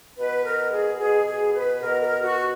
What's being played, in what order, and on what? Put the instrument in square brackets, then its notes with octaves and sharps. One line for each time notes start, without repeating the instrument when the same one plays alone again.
[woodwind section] B2 B4
A#4
G#4
B2 G#4
G#4
B4
B2 A#4
A#4
F#4